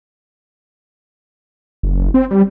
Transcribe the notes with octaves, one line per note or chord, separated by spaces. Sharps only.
F#1
C4
G3